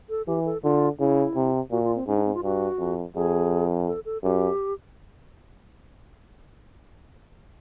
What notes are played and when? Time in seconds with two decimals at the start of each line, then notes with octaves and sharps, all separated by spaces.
0.10 A4
0.27 E3 G4
0.45 A4
0.63 D3 F4
0.99 C#3 E4
1.35 C3
1.71 A#2 F#4
1.84 F4
1.96 C4
2.07 G#2 C#4
2.16 D4
2.26 C4
2.34 F4
2.43 G2 F#4
2.79 F2
3.15 F2 G#4
3.87 A4
4.05 A4
4.23 F#2 G4